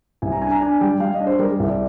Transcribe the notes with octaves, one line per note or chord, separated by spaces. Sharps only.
C2 G#5
A#5
D4 G#5
A#5
D4 G#5
G3 G5
G3 F5
D#5
D4
C5
G3 A#4
G#4
C2 A#4
D5